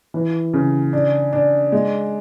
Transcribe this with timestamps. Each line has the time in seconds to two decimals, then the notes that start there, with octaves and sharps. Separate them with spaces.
0.14 E3
0.53 C#3
0.93 D4
1.33 D4
1.72 G#3